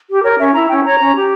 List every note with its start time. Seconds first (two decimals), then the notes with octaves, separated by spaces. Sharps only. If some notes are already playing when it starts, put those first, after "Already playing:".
0.08 G4
0.23 A#4 C#5
0.38 C#4 E5
0.53 E4 A#5
0.68 C#4 G5
0.84 C#5 A#5
0.99 C#4
1.15 G4